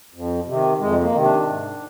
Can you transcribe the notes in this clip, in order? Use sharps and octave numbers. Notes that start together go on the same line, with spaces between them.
F2
C3
D#3
F2 G#3
A#3
C3 D#3
D4
G#2